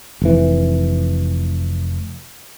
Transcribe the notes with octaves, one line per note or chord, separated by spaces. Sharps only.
F1 E3